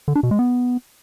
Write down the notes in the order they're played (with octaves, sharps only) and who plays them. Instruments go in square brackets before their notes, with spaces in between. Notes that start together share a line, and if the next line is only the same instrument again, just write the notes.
[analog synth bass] D3
D4
B2
G#3
B3